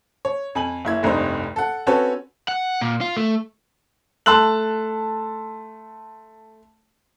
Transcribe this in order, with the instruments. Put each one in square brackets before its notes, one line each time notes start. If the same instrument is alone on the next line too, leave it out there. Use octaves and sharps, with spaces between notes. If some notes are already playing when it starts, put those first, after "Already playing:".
[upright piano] C#5
F2 G#5 F#7
F#1 E4 G#6
F1 C2 G2 D#4 C5
A4 F#5
C4 C#4 F#4 A4 B4 C#5
[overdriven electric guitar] F#5
A#2
F4
A3
[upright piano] A3 A5 C6 E6 F#6 F#7